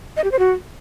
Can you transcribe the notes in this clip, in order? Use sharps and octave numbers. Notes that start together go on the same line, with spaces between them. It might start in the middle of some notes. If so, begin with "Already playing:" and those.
D#5
G4
C5
F#4